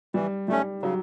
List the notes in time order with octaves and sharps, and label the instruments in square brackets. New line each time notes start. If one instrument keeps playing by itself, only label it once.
[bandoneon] E3 [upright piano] G3
[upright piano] G3 [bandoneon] A3 C#4
[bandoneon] C#3 [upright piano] F#3